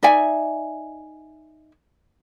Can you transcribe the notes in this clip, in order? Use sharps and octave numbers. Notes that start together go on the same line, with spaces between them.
D#4 D5 E5 G#5